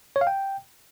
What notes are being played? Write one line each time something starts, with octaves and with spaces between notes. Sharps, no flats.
C#5
F5
G5